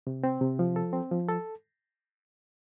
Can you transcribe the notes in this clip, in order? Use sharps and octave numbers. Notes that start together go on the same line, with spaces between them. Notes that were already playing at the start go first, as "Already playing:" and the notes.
C3
C4
C3
F3
A4
C4
F3
A4